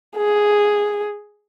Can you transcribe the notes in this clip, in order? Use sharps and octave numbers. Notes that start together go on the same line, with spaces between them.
G#4